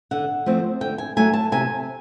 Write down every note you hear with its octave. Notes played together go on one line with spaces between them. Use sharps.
D3 F#5
F3 A3 C4
D3 G5
G#5
F#3 A3 G#5
A5
C3 G#5